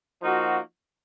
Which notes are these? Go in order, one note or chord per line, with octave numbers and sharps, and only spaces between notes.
F3 A#3 D#4 F#4